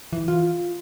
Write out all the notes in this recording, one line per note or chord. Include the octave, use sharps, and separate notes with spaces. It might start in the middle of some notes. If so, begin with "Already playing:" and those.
E3
F4